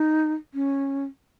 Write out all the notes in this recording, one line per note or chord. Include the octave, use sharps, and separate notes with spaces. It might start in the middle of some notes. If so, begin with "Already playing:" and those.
Already playing: D#4
C#4